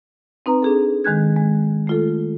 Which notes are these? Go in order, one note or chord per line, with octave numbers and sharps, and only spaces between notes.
C4 D#4 B4 A#5
D4 G#4 A4
D#3 G#3 F#6 G#6
G#3
A3 F4 A4